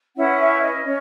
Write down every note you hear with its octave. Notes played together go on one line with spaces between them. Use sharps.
C#4 E4 B4 F#5
E5
D#5
C#4 C#5